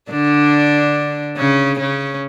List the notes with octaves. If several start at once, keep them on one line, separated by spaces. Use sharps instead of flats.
D3 D4
C#3 C#4
C#3 C#4